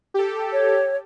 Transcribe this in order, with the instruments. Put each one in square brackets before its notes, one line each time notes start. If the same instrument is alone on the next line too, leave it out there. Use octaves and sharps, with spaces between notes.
[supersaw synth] G4 A4
[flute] C#5